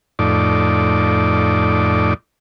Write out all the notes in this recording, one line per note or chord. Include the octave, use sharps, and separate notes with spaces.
F2 A2 D#4 D5